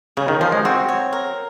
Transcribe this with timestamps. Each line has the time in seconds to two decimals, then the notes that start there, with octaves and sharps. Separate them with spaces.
0.17 C#3 G#4
0.28 D#3
0.41 F3 C5
0.52 G#3
0.65 C4 F#4
0.89 C#5
1.13 A#4